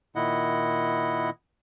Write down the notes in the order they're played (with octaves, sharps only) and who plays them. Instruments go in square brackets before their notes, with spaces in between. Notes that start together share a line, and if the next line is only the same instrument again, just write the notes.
[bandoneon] A#2 D#3 E4 D#5 F#5